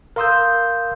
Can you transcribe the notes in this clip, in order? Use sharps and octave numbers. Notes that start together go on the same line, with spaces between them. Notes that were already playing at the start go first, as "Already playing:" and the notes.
A#4 F5 C6 D#6 E6 G6